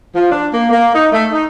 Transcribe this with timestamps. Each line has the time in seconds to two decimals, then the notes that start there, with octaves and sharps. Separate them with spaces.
0.14 F3
0.32 D4
0.52 A#3
0.71 A#3
0.93 D#4
1.11 A3
1.33 D#4